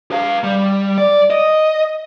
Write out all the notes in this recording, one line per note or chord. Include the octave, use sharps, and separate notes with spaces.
B4 F5
G3
D5
D#5